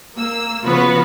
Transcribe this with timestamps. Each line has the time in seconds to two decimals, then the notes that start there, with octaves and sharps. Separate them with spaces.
0.16 A#3 E6
0.64 C#3 F3 B3 F4 F#4 B4